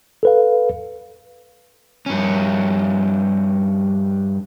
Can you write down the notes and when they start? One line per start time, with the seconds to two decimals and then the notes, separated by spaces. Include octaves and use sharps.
0.23 A4 B4 F5
2.06 G2 C#4